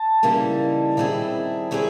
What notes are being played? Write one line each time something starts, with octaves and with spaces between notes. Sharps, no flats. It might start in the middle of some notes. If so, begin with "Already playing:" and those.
Already playing: A5
C#3 E3 G3 A#3 D#4
D#3 G3 C4 E4 G#4
D#3 G3 C4 E4 G#4